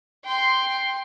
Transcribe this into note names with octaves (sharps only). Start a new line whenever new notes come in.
G5 C6